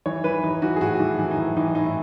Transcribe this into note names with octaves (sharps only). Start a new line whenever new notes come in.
E3 C#5
E3 B4
E3 D#4
E3 F#4
G#4
A2 F#4
E3
E3
D#4
E3
E3 D#4
A2 D#4
E4